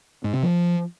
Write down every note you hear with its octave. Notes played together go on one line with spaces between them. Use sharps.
G#2
C3
F3